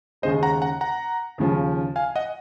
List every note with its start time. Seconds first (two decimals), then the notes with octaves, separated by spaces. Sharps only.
0.22 D#2 C#3 G#3 C5 D#5
0.43 F#5 A#5
0.62 F#5 A#5
0.81 F#5 A#5
1.38 D#2 C#3 F3
1.96 F5 G#5
2.16 D#5 F#5